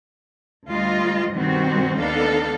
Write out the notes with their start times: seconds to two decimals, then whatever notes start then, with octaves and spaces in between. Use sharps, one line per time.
0.68 D2 G3 F4 D#5
1.33 G2 B2 D#3 G3 C4 F#4
1.99 D#2 B3 D4 D#4 A4 F5